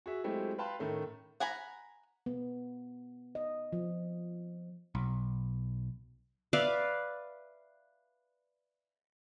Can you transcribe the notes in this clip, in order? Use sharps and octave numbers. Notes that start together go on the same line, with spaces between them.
F#4 G#4 E5
F#3 G#3 A3 C4 E4 G4
B4 F5 G5 A5 B5 C6
A2 D#3 A3 C#4
F#5 G#5 A#5 B5
B3
D#5
F3
B1
B4 D5 E5 F5